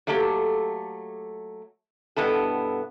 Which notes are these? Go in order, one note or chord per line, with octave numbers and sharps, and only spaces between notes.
F#3 A3 A#3 G4 A4
G2 B2 B3 E4 A4